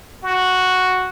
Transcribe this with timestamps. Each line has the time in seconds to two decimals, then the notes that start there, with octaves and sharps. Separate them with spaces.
0.23 F#4